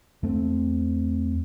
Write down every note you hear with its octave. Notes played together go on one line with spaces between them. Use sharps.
E2 A3 C4